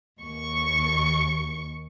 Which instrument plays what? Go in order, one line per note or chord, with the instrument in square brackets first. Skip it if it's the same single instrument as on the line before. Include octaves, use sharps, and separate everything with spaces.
[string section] D#2 C#6